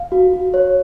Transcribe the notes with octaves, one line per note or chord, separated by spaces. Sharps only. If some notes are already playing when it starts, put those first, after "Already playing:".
Already playing: F5
F#4
F#4
C#5